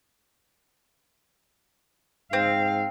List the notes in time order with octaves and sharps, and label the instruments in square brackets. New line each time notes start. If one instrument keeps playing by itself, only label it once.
[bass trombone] G#2 [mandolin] C4 [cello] F5